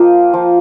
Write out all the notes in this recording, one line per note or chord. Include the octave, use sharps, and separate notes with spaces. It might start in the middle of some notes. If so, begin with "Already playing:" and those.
Already playing: F3 A#3 F4 D#5 G5
F3